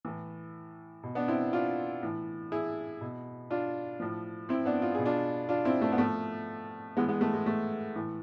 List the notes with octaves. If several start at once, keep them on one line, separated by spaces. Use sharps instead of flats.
A2 E3
B2
B3 D4
C4 E4
D4 F4
A2 E3
E4 G#4
B2
D4 F4
A2 F3
C4 E4
B3 D4
F4
B2 G#4
D4 F4
D4 F4
C4 E4
A3
B3
A2 F3 A3
A2 E3 G#3 B3
G#3 B3
A3
G#3
A3
A2 E3